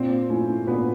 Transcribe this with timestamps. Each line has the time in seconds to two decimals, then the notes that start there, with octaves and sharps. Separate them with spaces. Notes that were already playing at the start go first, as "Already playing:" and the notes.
Already playing: A#2 C4 C5
0.29 F3 A3 C#4 E4
0.67 A#2 B3 B4